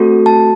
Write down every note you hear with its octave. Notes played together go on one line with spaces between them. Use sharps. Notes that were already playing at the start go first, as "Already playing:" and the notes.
Already playing: A3 C4 F#4 A4
A5